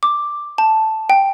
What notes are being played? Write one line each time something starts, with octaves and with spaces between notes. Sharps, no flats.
D6
A5
G5